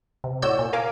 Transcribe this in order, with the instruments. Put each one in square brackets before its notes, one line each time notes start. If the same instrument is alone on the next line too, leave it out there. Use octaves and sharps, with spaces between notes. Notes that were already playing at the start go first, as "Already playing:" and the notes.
[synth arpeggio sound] C3
A2 F#4 C#5 D5 E6 G6
A#2
A#4 F5 G#5 D6